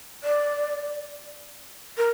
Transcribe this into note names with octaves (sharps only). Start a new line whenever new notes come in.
D5
A#4